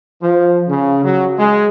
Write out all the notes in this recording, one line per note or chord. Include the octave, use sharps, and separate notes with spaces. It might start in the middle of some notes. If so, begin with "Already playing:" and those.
F3
C#3
F#3
G#3